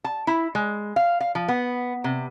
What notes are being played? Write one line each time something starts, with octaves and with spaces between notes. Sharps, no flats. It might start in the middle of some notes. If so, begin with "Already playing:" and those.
A5
E4
G#3
F5
F5
F3
B3
C3